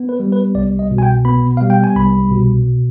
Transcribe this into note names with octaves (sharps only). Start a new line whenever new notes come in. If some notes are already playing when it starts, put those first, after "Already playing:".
Already playing: B3
B4
G3
B4
C2 D5
D#5
B2
G#5
G5
B3 B5
G3 F5
G5
G#5
C2 B5
B2